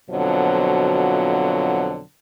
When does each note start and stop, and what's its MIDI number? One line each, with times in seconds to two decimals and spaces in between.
0.10 2.02 41
0.10 2.02 47
0.10 2.02 50
0.10 2.02 53
0.10 2.02 54